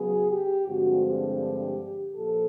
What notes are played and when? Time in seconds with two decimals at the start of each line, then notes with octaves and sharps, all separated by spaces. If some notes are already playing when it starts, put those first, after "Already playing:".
Already playing: C#3 F#3 B3 G#4
0.30 G4
0.67 G2 D3 F3 G#3 C4 F#4
1.05 G4
2.16 A#2 F3 A4